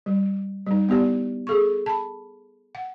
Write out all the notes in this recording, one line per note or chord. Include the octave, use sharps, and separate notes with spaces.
G3
G3 D#4
B3 E4 G4 D5
G#4 A4 C#6
A5 B5
F#5